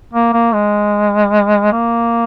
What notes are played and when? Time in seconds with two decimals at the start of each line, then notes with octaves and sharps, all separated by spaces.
0.13 A#3
0.33 A#3
0.53 G#3
1.72 A#3